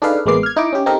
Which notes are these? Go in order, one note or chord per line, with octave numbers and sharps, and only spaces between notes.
D4 D#4 G#4 A4 B4 F5
A1 G#3 A#3 B3 D6 C7
F6 G#6
D#4 E4 D6
C#4 G4
C4 D#4 G4 A4 A#4